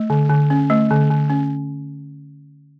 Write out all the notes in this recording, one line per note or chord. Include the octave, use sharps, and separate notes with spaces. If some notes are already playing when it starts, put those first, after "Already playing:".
Already playing: A3
D3
D3
C#4
A3
D3
D3
C#4